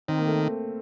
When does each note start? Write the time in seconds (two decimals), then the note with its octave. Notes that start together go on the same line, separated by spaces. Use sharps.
0.08 D#3 C4
0.18 A#3
0.27 A3